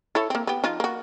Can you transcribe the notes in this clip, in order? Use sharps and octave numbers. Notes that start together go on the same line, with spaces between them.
E4 A4 C#5
A#3 C4
B3 G4
F3 D#4 F4
A#3 F#4